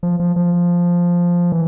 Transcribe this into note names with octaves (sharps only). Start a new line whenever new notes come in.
F3
F3
F3
E3